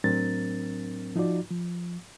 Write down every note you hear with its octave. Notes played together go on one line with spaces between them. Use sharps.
A2 F#3 C4 D4 A#4 A6
F3 D#4 F4 F#4 D5
F3